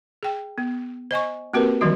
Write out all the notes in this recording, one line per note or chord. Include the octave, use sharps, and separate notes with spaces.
G#4 G5
B3
C5 D#5 G#5 C#6
A#3 C4 F#4 G4 A#4 B4
D#3 E3 F#3 G3 D#4 F#4